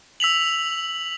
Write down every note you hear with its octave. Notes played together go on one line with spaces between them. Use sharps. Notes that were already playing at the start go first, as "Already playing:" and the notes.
E6 B6 F7 F#7